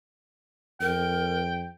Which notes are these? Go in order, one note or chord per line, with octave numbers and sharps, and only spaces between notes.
F2 A#4 G5